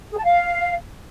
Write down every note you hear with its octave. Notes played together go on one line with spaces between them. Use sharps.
G#4
A5
F5